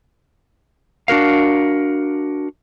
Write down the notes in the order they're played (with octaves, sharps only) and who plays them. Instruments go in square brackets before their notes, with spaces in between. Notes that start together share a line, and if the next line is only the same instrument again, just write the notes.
[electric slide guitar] D4 F#4 A#4 F5